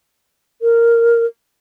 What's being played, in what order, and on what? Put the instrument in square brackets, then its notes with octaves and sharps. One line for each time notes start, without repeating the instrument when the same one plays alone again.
[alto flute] A#4